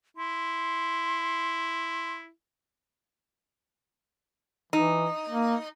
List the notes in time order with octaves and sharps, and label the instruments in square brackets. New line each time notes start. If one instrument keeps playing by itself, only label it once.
[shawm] E4 [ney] C6
[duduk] E3 [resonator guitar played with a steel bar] D#4
[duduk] A#3